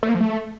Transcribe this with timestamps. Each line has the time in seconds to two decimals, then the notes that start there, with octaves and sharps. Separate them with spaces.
0.03 A3
0.09 A#3
0.15 F3
0.21 A3